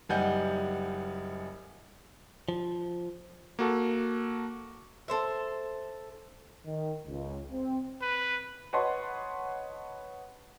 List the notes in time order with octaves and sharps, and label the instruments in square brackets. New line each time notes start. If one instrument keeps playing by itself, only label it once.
[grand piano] F#1 G3 D#4 F#5 G#5 G6
[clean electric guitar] F3
[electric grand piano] A#3 F#4 A4
[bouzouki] A4 C5 E5
[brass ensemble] D#3
C#2
C4
[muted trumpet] B4
[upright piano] B4 C#5 D#5 F#5 A5 C6